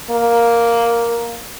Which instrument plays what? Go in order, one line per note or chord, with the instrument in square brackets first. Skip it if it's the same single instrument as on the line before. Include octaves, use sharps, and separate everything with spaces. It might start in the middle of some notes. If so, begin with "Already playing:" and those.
[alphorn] A#3